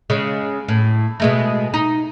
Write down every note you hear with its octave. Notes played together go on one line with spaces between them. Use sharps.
C#3 G#3
A2
B2 G#3 A3
D#4